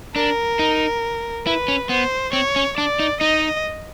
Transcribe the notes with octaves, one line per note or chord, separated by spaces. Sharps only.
D4 A#4
D#4
E4 B4
C#4
B3 C5
C4 C#5
C#4
D4 D5
D#4
D#4 D#5